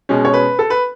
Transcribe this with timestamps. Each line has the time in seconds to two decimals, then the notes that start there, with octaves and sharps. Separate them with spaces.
0.09 B2 G#3 C#4
0.25 C#5
0.34 B4
0.59 A4
0.70 B4